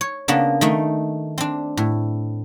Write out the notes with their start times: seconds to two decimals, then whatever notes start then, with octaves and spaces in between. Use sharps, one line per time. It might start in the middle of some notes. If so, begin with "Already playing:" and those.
0.01 C#5
0.28 C#3 A#3 B3 D4
0.61 D#3 A3 D#4
1.38 C4 D4
1.77 A2